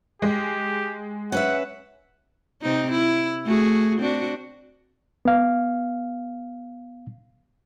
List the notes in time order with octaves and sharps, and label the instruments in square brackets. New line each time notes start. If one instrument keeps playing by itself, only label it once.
[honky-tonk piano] G#3 [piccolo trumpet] G4
[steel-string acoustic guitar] C#4 B4 E5 [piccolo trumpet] F#5
[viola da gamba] C3 C4 D#4
E4
A3 F#4 G#4
C4 D4 F#4
[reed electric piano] B3 F5